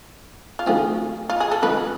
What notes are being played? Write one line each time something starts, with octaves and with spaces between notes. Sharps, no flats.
F4
D2 D3 F3 A3 C4 G#4
F4
G#4
A4
F2 D3 G#3 B4